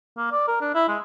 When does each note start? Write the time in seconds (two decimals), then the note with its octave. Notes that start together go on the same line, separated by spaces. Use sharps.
0.18 A#3
0.32 D5
0.48 A#4
0.61 D4
0.75 E4
0.88 G#3